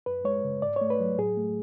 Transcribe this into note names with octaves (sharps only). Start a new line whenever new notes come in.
F#2 B4
G#3 C#5
C#3
G#2 D5
C#5
A3
B4
F#3
A2 G#4
A3